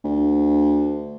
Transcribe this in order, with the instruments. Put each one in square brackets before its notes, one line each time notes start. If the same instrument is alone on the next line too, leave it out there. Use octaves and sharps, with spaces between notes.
[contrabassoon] D2